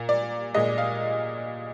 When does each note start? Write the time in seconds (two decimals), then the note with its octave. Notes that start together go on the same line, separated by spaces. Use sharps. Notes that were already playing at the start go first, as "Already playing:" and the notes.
Already playing: A#2
0.09 D5
0.54 A#2 G#3 D#5
0.78 F5